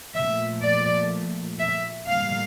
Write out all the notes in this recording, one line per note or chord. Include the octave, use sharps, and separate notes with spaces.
A#2 F3 A3 E5
D5
E5
A2 G3 A#3 F5